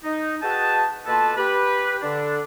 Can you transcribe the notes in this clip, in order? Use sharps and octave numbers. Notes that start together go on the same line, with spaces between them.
D#4
F#4 G#4 B4 D#5 G5 A5
B2 A#3 F4 A4 B4 A5
G4 B4
D3 D4